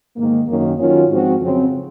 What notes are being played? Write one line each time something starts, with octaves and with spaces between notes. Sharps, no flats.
G#2 D#3 A#3
F#2 D#3 A#3 C#4
D#3 F#3 C#4 F4
G#2 F3 C4 F#4
F2 C#3 F#3 C4